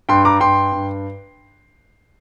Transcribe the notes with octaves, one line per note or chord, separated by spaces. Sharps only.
G2 G5 C6
A#5 D6
G2 G5 C6
G2